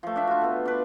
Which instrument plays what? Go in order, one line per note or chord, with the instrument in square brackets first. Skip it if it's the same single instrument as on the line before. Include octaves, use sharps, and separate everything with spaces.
[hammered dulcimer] F3 A3
D4 E5
F4 F#4
A3 B3
D4 B4